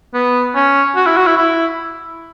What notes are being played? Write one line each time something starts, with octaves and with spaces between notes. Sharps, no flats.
B3
C#4
F#4
E4
F#4
E4
E4